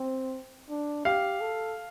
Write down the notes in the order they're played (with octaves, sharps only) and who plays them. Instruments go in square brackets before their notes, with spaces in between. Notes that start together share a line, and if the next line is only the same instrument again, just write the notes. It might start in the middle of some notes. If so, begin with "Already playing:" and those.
Already playing: [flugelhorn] C4
D4
[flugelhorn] G4 [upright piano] F5
[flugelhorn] A4